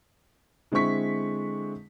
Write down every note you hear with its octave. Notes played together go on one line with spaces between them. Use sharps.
D3 G#3 C4 E4 C#6 B6